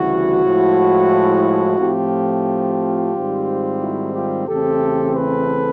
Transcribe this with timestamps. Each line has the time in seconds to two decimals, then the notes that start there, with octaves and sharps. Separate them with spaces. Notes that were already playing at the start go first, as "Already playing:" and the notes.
Already playing: D2 C#3 E3 G3 E4 F#4
0.44 A2 F3 G#3
1.78 A2 F3 A3 C4 F4 G4
3.13 G#2 D#3 G3 C4
3.80 E4 F#4
4.14 F4 G4
4.47 E2 C#3 E3 A3 C4 G4 A4
5.15 A4 B4